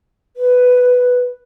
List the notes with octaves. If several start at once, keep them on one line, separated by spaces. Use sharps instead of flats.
B4